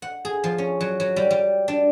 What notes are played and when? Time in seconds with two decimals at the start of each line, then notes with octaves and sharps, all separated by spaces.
0.02 F#5
0.25 G#4
0.44 F3
0.58 C#4
0.81 F#3
1.00 F#3
1.16 G3
1.31 G3
1.68 D4